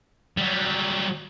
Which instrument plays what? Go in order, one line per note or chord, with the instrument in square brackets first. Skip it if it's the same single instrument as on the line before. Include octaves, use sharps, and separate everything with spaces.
[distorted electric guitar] F#3 G3